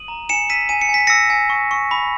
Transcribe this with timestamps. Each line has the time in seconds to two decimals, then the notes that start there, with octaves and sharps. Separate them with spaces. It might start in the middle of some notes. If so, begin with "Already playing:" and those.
Already playing: D#6 D#7 F#7
0.08 A#5
0.29 G#5 C#7 E7
0.50 E6 B6 D#7
0.69 G#5 D#7
0.81 C#7
0.89 G#5
0.94 B6
1.07 E6 A#6 C#7
1.30 G#5
1.50 C#6
1.71 C#6
1.91 B5